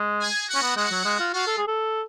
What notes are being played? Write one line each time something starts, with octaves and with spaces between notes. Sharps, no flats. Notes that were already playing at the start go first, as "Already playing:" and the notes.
Already playing: G#3
G#4 G#5
F#4 F#5
C#4
B3
G#3 F#4 F#5
F#3
G#3
F4
F4 F#4 F5
A4
G#4
A4